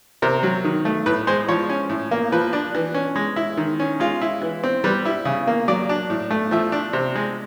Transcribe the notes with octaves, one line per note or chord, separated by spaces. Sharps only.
C3 A#4
F#3
D#3
A3
A2 B4
G#3 C5
F3 C#5
C#4
A2
A#3
F3 B4
D4
E3
C#4
G#3
E4
D#3
C#4
G#3 F4
E4
E3
C4
G3 B4
E4
C#3
A#3
F#3 D5
D4
A2
A3
F3 E5
D4
C3
G#3